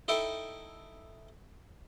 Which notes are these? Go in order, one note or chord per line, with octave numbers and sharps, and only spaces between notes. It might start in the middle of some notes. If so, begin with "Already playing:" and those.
D#4 E4 A4 E5 G5